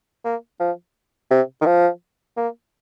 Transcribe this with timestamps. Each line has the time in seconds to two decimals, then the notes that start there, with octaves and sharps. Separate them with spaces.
0.25 A#3
0.60 F3
1.31 C3
1.61 D#3
1.66 F3
2.37 A#3